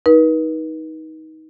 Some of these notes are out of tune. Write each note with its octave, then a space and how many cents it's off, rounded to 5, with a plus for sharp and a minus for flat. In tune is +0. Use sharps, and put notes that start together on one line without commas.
D#4 +20 B4 -40